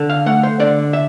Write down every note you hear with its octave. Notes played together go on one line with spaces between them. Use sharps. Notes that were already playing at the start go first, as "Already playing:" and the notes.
Already playing: D3
F5
A3 F#5
C5
D3 D5
E5